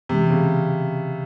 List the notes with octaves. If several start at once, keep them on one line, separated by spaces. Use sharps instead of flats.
C3 E3 G#3 C#4
C#3